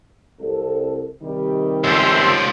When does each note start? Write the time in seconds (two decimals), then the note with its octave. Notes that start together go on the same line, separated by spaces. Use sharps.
0.40 C2 A4
1.22 C3 D#3 G3
1.84 C#2 F3 E5 C6